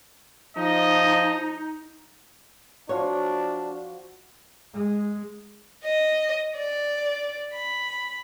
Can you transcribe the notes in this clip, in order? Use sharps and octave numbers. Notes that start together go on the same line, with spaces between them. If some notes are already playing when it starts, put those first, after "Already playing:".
F3 D#4 D#5
F3 D4 F4 F#4 C#5
G#3
D#5
D5
B5